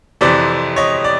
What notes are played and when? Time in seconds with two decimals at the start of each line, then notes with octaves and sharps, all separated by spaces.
0.21 F2 C3 E3 C5 D5
0.76 C#5 D#5
1.04 D5